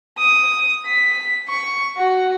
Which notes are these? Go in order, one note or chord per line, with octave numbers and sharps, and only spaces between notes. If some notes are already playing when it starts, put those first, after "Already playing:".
D#6
B6
C#6
F#4